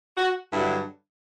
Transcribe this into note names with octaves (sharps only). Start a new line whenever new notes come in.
F#4
G2 D3 F#3 E4